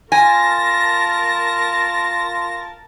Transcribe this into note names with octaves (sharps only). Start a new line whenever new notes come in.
F4 A#4 G#5 A5 A#6